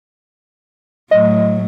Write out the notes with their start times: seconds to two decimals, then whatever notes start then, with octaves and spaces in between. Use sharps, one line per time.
1.11 A2 F#3 D#5